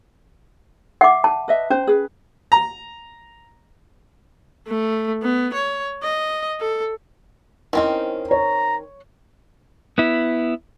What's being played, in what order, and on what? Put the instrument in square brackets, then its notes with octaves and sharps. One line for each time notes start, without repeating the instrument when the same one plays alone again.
[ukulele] E5 [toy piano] F#5 D6
[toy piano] A5
[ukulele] B4 D#5 E5
[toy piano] C#4 [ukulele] C5
[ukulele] G#4 B4
[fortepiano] A#5
[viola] A3
B3
C#5
D#5
A4
[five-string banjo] D#3 C4 C#4 [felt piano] E4 D#5
[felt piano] C#5 [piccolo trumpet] A#5
[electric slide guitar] B3 E4